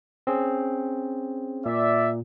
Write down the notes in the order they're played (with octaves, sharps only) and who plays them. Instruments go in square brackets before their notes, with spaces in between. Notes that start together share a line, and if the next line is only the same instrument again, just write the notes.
[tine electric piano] C4 C#4 G#4
[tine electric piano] A#2 [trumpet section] D5 E5